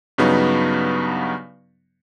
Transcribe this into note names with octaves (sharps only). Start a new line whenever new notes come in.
G2 C#3 F#3 B3 D#4